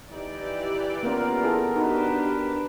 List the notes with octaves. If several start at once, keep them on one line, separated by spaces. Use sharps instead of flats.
E3 D#4 G4 D5
A#3 B3 C#4 F4 A#4
E4 G#4 A4
D4 D#4 F#4 G4 B4